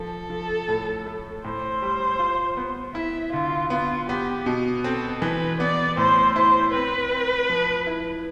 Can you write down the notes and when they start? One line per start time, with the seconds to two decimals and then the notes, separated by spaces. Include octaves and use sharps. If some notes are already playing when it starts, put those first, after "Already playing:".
Already playing: F3 A4
0.30 F3
0.68 A2
1.06 A3
1.44 A2 C5
1.82 G3
2.19 F4
2.57 B3
2.95 E4 E5
3.33 D3 F4
3.70 B3 F4
4.09 B3 G4
4.46 B2
4.84 C4 A4
5.22 E3 B4
5.60 B3 D5
5.97 A2 C5
6.36 E4 C5
6.73 C4 B4
7.12 C4
7.50 F3
7.87 E4